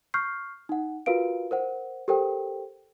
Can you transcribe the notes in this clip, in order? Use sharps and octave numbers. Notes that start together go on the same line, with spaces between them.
C#6 F6 G6 C7
D#4 F#5
F4 F#4 A#4 B4 F5 D7
A#4 C5 F#5
G4 A4 A#4 C5 G5